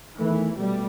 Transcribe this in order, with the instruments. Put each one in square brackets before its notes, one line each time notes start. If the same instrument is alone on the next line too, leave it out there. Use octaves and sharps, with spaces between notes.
[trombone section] E2 D#3 A3 [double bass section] E3
[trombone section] B2 A3 [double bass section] G3